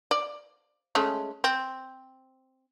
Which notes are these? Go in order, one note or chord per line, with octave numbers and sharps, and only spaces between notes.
D5
G#3 A3 C#4
C4